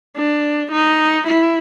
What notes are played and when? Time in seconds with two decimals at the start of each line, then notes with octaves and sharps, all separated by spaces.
0.17 D4
0.71 D#4
1.27 E4